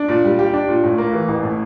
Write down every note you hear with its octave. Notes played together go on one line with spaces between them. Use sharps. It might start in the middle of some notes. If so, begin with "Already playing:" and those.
Already playing: D4
A#2
G3
G4
D4
A#2
A2
A#3
E3
A1
A2